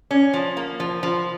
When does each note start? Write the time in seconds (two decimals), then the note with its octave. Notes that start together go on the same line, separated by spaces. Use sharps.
0.11 C#4
0.34 F3
0.57 A#3
0.80 F3
1.03 F3